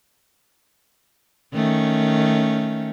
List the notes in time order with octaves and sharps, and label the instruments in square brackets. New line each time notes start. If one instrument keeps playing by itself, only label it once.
[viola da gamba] D#3 A3 C#4